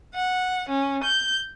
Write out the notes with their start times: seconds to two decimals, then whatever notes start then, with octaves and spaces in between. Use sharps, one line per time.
0.14 F#5
0.68 C#4
1.03 G6